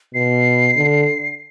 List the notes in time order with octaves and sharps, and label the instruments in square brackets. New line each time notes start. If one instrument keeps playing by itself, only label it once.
[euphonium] B2 [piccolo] C7
[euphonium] D3